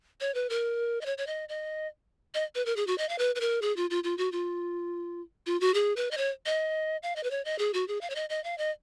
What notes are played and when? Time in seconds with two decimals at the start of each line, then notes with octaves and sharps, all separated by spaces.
0.21 C#5
0.34 B4
0.50 A#4
1.01 D#5
1.06 C#5
1.18 C#5
1.27 D#5
1.49 D#5
2.34 D#5
2.55 B4
2.66 A#4
2.76 G#4
2.87 F#4
2.98 D#5
3.09 F5
3.18 B4
3.35 B4
3.40 A#4
3.62 G#4
3.76 F4
3.90 F4
4.04 F4
4.18 F#4
4.32 F4
5.46 F4
5.61 F#4
5.74 G#4
5.96 B4
6.11 D#5
6.17 C#5
6.46 D#5
7.03 F5
7.16 D#5
7.23 B4
7.31 C#5
7.45 D#5
7.59 G#4
7.74 F#4
7.88 G#4
8.01 F5
8.10 C#5
8.15 D#5
8.30 D#5
8.44 F5
8.58 D#5